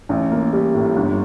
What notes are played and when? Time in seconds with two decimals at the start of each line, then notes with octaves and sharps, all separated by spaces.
0.09 A1
0.31 A#3
0.52 G3
0.74 A2
0.96 G1